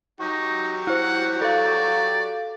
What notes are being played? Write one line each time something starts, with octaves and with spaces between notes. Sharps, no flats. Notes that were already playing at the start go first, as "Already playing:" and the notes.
F#3 D#4 F#4 G4
E4 C5 F#5
A4 D5 F5